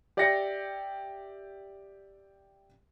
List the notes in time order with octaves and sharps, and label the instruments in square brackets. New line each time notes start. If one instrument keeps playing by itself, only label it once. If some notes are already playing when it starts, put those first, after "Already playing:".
[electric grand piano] G4 D5 E5 G5 A#6 C#7